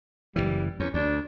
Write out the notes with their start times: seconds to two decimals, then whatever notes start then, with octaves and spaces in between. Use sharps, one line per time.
0.36 F#1 C2 E3 G3
0.80 E2 C#4
0.94 D2 D4